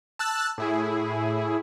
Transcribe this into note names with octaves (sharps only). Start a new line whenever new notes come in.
A5 E6 F#6
A2 E4 G#4